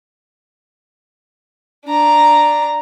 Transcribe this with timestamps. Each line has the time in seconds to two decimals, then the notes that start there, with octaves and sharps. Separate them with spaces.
1.86 D4 A#5